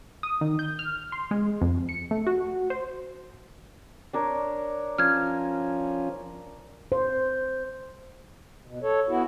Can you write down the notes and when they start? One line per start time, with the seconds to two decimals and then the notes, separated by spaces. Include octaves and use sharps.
0.23 D#6
0.41 D#3
0.59 G6
0.79 F6
1.12 C6
1.31 G#3
1.61 F2
1.89 C#7
2.11 A3
2.27 F#4
2.70 C5
4.13 D4 A#4 C#5
4.98 F3 C#4 F6 G#6
6.92 C5
8.65 B2
8.82 A4 C#5
9.08 B3 E4 F#4